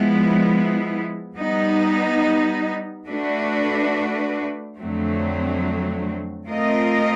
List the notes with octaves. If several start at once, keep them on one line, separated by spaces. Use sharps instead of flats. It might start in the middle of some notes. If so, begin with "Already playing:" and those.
Already playing: F3 G#3 B3 E4
G3 B3 D#4
A3 D4 F#4 B4 D5
F2 D3 F#3 A3 C4
A3 C4 F4 A#4 D#5